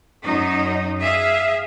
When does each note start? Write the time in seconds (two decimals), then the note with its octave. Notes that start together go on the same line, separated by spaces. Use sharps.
0.23 F#2 D#4
1.00 G#4 E5 F5